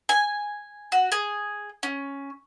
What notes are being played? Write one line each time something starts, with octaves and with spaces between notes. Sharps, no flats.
G#5
F#4
G#4
C#4